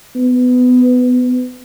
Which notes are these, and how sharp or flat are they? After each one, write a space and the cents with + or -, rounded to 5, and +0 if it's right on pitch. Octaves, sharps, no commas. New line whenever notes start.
B3 +20